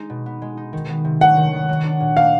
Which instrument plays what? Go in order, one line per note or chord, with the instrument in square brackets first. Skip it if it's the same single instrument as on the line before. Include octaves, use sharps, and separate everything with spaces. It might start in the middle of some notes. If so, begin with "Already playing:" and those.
Already playing: [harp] G#3 D#4
B2
B3
G#3
D#4
D#3
B3
C3
[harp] F#3 [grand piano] F#5
[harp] D#3
B3
F#3
D4
A#2
[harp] A#3 [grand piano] F5